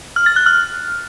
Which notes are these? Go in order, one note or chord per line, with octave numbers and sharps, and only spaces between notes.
F6
A6
F#6
F6